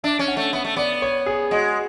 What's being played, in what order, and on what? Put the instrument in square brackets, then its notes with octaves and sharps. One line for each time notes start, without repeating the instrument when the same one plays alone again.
[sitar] D4 [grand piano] E5
[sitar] C#4
[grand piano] F#5
[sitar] A3
[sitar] B3 [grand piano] E5
[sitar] A3
[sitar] B3 [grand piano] D5
[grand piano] C#5
G#4
[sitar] G#3 [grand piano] F#4